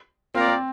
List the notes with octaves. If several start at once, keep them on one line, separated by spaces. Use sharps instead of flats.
A#3 C4 F4 A#4 D5
C4